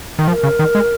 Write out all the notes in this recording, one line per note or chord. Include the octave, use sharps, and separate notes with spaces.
D#3
F3 A#4
C#3
D#3
G#3